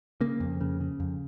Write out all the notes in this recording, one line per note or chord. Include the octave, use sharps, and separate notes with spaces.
C#3 A#3
F2
C#3
C#3
F2